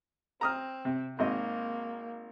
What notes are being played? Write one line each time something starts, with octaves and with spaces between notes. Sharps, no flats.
C4 A#5 D#6 F6
C3
G#1 A#3 C4 D#5